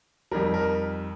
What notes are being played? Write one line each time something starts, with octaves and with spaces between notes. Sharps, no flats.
F2 D#3 G3 A#4
A#4